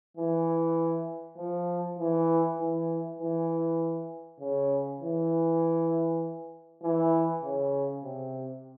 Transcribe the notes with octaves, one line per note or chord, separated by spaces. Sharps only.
E3
F3
E3
E3
E3
C#3
E3
E3
C#3
C3